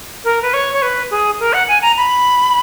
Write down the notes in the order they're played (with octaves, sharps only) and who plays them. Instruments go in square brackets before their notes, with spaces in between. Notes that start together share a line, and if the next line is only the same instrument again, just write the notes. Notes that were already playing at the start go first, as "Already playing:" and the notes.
[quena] A#4
B4
C#5
C#5
B4
G#4
A#4
F#5
G#5
A#5
B5